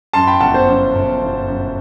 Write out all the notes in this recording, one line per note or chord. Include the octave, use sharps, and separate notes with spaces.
F#2 A5 C6
G5 B5
G1 F#5 A5
C5
F#2
G1
G1
F#2